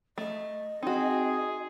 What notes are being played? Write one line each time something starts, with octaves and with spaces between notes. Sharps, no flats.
A3 D#5
C4 D#4 F#4 G#4